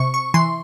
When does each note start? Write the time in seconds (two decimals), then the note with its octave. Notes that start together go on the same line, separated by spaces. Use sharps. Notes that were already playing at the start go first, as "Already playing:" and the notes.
Already playing: C3 C#6
0.14 C#6
0.34 E3 C6